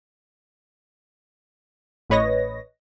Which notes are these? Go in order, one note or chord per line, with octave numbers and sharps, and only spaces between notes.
A1 A2 B4 C#5 D#5 A#6